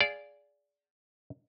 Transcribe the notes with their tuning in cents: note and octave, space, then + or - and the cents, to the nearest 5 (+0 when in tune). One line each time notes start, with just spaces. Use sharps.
G#4 +0 D5 -15 F5 +0